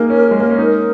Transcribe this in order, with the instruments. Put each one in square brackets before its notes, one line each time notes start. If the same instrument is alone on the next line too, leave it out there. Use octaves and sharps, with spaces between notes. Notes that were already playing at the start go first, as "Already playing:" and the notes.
Already playing: [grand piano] A#3 D#4 G#4 [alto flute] A#4
[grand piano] C#4
G#3
A#3
C#4
[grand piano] D#4 [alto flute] A#4